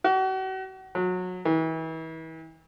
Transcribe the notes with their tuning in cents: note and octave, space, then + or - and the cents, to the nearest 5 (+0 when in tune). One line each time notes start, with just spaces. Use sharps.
F#4 +40
F#3 -25
E3 -35